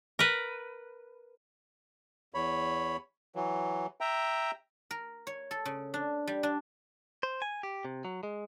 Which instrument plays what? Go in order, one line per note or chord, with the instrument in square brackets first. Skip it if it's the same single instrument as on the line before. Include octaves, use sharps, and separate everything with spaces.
[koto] A#4 B4
[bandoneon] E2 C#5 B5
E3 F#3
E5 G5 A#5
[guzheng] A#4
C#5
A4
C#3
D4
G3
D4
[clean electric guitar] C5
G#5
G4
C3
F#3
G#3